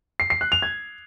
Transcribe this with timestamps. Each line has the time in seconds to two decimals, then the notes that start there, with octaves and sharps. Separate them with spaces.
0.20 C7
0.30 C7
0.41 F#6
0.52 F7
0.62 G#6